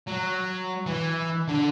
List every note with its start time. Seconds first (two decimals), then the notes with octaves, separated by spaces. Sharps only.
0.07 F#3
0.86 E3
1.48 D3